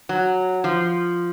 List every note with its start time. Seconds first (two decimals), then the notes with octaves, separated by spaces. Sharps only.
0.09 F#3
0.64 F3